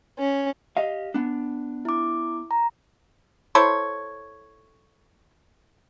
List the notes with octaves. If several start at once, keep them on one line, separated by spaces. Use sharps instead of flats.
C#4
G4 D#5 F5
B3 D4
E4 D6
A#5
E4 A4 C5 C#5